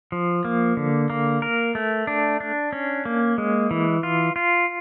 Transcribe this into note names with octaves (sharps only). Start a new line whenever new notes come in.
F3
A#3
D3
A#3
A#4
A3
D4
D4
C#4
A#3
G#3
E3
F4
F4